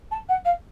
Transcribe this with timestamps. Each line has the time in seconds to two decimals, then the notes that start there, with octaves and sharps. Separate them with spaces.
0.11 A5
0.29 F#5
0.45 F5